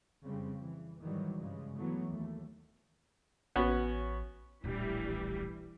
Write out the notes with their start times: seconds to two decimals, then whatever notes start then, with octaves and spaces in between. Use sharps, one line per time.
0.24 F2 C#3 G3 C4
0.62 E3
1.01 G#2 D#3 E3 F#3 G3
1.39 G2 C#3 G#3
1.76 E3 F#3 A3 B3
2.10 D#2 A3
3.56 A1 B3 C#4 F#4
4.64 D1 A#1 E3 G3